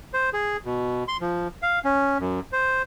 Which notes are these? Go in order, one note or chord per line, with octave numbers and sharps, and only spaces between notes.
C5
G#4
B2
C6
F3
F5
C#4
F#2
C5